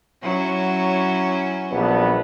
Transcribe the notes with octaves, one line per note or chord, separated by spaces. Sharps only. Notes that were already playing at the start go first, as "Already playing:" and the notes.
F#3 C#4 E4
A#1 G2 B3